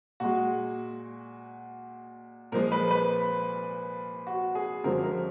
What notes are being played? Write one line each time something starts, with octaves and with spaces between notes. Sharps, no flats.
A#2 G#3 F#4
A#2 F3 G#3 A#4
B4
B4
F#4
G#4
F#2 D3 F3 G#3 A#4
A#4